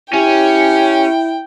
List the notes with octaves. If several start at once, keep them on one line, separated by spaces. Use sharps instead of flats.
C#4 E4 G4 G5